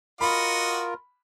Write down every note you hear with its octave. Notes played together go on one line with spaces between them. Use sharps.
F4 F#4 A#4 D#5 F#5 B5